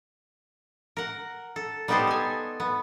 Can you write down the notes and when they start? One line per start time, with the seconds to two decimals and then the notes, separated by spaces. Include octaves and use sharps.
0.97 A#4 F#5
1.56 A4
1.88 G3 B3 D#4 G4 A4 C5
2.07 A4 G#5
2.60 B3